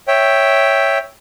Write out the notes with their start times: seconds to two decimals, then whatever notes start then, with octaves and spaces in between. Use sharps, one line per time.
0.08 C#5 E5 G5